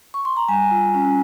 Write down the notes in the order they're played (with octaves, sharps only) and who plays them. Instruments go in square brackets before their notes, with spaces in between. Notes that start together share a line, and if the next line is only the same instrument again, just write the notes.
[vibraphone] C#6
C6
A#5
G3 G#5
F4
C#4